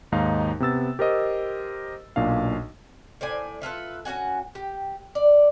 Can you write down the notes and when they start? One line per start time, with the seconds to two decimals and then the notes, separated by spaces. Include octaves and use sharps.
0.12 D#2 G#2 D#4 F5
0.60 C3 B3 E6 A6
0.99 G4 A#4 C5 D#5
2.16 B1 A#2 D4 F5
3.21 A2 C5 D5 G#5
3.62 E4 F4 A4 B4
4.05 C#4 F#4 F#5 G#5
4.55 G4
5.15 D5